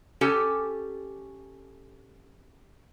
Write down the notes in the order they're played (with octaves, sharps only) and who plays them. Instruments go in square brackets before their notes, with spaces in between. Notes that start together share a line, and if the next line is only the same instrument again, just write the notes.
[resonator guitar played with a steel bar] C#4 G4 A4 G#5